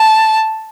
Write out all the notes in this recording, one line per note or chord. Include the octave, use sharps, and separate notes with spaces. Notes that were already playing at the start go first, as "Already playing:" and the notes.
Already playing: A5